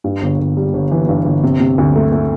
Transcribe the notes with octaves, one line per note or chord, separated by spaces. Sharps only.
G2
G1
G1
G3
G1
E3
G2
G1
C3
C3
D2
A3
A3